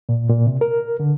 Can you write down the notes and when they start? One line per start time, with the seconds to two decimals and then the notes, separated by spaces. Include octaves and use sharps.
0.09 A#2
0.29 A#2
0.47 C3
0.61 A#4
1.00 D3